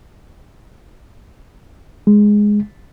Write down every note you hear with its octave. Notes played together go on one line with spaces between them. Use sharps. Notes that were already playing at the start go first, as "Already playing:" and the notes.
G#3